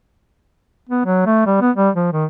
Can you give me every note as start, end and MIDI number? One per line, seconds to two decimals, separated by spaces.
0.89 1.05 59
1.05 1.25 54
1.26 1.45 57
1.46 1.57 55
1.61 1.71 59
1.76 1.90 55
1.95 2.08 53
2.12 2.25 51